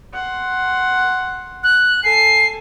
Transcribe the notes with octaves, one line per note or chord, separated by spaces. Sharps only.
F#5 C6
F#6
A4 G#5 C7